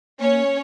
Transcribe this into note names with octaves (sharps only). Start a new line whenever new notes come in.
A#3 C#4 C#5